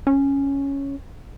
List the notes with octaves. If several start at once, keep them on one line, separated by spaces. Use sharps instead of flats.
C#4